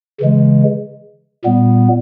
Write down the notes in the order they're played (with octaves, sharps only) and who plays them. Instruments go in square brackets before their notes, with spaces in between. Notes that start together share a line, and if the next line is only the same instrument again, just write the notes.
[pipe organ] C#3 E3 G#3
A#2 G3 B3